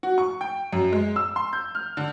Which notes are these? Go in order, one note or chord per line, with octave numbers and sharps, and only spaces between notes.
F#4
C#6
G5
F#2
G#3
E6
C6
G6
F6
D3